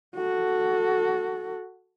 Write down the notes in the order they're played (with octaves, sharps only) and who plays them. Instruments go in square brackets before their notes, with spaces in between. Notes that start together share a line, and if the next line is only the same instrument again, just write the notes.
[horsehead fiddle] F#4 A4